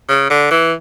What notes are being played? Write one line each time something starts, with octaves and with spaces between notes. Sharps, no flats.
C#3
D3
E3